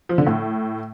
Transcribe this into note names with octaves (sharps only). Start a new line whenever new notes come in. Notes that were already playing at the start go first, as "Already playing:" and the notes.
F3
D3
A2